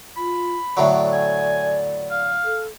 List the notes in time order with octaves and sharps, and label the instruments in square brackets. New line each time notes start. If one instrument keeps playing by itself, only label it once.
[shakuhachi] F4 [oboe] B5
[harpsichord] A2 D3 F#3 [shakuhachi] D5
[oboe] G#5
F5
[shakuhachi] A4